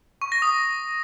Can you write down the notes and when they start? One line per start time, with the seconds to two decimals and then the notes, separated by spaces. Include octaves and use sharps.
0.22 C#6
0.32 A#6
0.42 D#6